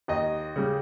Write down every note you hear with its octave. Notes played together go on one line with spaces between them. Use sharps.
D#2 D#5
C#3 G3